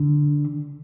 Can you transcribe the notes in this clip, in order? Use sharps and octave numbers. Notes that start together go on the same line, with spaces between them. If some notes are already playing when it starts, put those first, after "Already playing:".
Already playing: D3